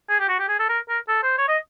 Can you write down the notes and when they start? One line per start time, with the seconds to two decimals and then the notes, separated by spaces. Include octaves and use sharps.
0.09 G#4
0.20 G4
0.29 F#4
0.39 G4
0.49 G#4
0.59 A4
0.69 A#4
0.89 A#4
1.08 A4
1.23 C5
1.38 C#5
1.48 D#5